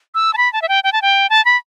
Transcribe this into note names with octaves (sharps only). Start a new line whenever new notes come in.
E6
A5
B5
A5
E5
G5
G5
A5
G5
A5
B5